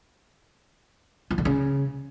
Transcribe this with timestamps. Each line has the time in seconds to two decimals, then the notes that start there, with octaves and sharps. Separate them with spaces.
1.31 F3
1.38 D3
1.45 C#3